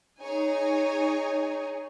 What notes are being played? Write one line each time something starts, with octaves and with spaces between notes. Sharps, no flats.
D#4 G#4 C#5 G#5